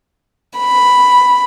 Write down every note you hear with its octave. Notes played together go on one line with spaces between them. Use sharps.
B5